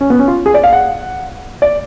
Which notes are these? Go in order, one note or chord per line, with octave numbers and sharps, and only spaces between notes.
C#4
B3
C#4
F4
G#4
D5
F5
F#5
D5